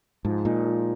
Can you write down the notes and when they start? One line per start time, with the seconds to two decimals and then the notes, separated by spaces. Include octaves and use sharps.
0.25 G#2 F3
0.45 A#2 G#3 D#4
0.64 F3